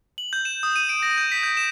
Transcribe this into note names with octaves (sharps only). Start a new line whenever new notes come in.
F#7
G6
E7
D#6
D#7
D7
A#6
G6
B6
G6
E7